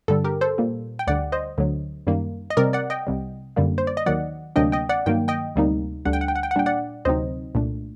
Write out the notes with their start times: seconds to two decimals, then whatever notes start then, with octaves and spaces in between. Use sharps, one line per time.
0.08 G2 D3 G3 A4
0.24 G4 A#4
0.41 A4 C5
0.58 A#2 G3 A#3
0.99 G5
1.07 D2 D3 G3 D5 F#5
1.32 C5 D#5
1.58 D2 D3 F#3
2.07 F#2 D#3 G3 A#3
2.50 D#5
2.57 C3 G3 C4 A#4 D5
2.73 D5 F#5
2.90 D#5 G5
3.07 C2 C3 G3
3.56 F#2 D3 G3 A#3
3.78 C5
3.87 D5
3.97 D#5
4.06 D#2 D#3 F#3 D5 F#5
4.56 D2 C3 F#3 A#3 D4 D#5 G5
4.72 D#5 G5
4.89 D5 F#5
5.06 G2 D#3 F#3 A#3 G5
5.28 D#5 G5
5.56 D2 C3 G3 A#3 D#4
6.05 D2 D3 G3 D4 F#5
6.13 G5
6.21 F#5
6.28 G5
6.35 F#5
6.43 G5
6.51 F#5
6.56 A#2 G3 D4 G5
6.66 D5 F#5
7.05 D2 C3 F#3 C4 D#4 C5 D#5
7.55 C2 A#2 A3 D4